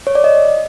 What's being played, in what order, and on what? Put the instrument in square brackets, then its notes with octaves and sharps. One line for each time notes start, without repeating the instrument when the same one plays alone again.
[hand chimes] C#5
D5
D#5